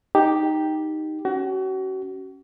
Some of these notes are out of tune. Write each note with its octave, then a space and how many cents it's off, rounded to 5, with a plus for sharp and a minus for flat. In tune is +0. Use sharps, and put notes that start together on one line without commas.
D#4 +0 G4 +0
C#4 +0 F#4 +35